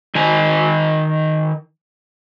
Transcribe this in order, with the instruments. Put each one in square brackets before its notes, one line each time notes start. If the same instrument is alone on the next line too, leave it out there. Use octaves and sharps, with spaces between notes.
[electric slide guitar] D#3 G#5